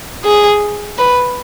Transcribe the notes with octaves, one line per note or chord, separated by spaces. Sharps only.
G#4
B4